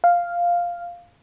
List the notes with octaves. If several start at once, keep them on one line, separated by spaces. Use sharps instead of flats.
F5